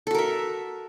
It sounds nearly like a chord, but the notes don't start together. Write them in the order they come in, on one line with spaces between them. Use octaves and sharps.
A4 F#4 A#4 E5